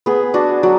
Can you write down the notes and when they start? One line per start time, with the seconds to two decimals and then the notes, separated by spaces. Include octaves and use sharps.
0.06 B3 G#4
0.34 D4 F#4
0.63 F#3 F#4